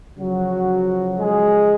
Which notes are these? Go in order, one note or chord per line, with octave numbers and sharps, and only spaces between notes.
C#3 F3 F#3 F#4
G#3 G#4